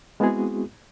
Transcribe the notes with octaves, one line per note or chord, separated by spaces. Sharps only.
G#3 B3 C4 E4 F#4 G#4